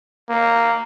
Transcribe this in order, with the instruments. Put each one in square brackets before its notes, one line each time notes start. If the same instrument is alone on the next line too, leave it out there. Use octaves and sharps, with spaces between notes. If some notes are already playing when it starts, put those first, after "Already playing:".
[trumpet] A#3